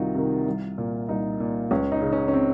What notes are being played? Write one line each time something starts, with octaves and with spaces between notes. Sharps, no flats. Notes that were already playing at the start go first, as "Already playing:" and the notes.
Already playing: C2 C3 D#3 D#4 F4 F#4
C3 D#3
C2
A#2
C2 D#4
A#2
C#2 C#4
D#4
C#3
C#4
C#4
C4